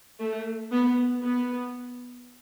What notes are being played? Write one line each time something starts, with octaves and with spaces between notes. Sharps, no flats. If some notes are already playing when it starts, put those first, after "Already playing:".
A3
B3
B3